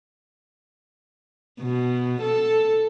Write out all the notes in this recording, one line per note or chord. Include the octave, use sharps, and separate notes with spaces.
B2
A4